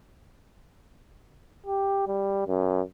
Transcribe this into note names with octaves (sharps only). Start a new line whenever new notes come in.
G4
G3
F#2